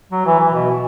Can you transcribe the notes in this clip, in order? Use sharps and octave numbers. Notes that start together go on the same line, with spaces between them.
F#3
E3
E3
B2